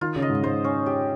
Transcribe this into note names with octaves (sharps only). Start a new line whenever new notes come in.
D#3 F4
C#3
D#5
G#2
G#2 C5
C#4
G4